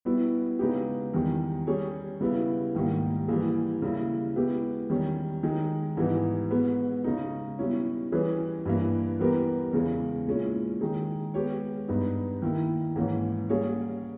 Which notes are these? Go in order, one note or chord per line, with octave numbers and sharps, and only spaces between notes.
B2 G3 B3 E4
C#3 G#3 B3 D#4 G4
E2 D#3 G3
G3 C#4 G#4 C#5
C#3 G3 B3 E4
G#2 D#3 G3 A#3
E3 G3 A#3 E4 G#4
C#3 G3 A#3 E4
B2 G#3 B3 E4 G4
E2 D#3 G3 C#4
D#3 G#3 D#4 G#4
G#2 E3 G3 B3 D#4
B2 G#3 B3
C#3 G#3 D#4
B2 G3 C#4 E4
E3 G3 C#4 G#4 B4
G2 E3 A#3
E3 G3 B3 G4 A#4
E2 C#3 G#3
A#2 G#3 C#4 E4
D#3 G#3 D#4 G#4
G#3 B3 G4 C#5
G2 G3 B3 D#4
D#3 A#3 E4
G#2 E3 A#3 C#4
G3 A#3 C#4 G#4 C#5